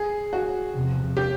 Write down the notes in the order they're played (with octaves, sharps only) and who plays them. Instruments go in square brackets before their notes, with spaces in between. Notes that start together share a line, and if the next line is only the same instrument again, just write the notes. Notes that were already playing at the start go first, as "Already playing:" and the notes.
Already playing: [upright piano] G#4
F#4
[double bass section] E2 C3 F3
[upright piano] G4